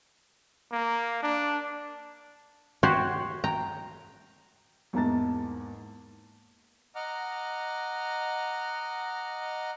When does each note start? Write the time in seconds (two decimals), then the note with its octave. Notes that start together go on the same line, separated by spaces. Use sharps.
0.72 A#3
1.23 D4
2.83 F#4 G4 C5 C#5
3.44 G5 A#5
4.93 E2 G#2 A#3 A5 A6
6.95 D#5 F#5 A#5 D6 F6